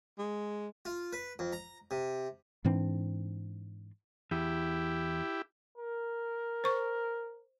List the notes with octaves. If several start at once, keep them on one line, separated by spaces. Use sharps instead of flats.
G#3
F4
B4
F2
A#5
C3
G#2 E3 C4 D4
E2 E4 G4
A#4
C5 C#6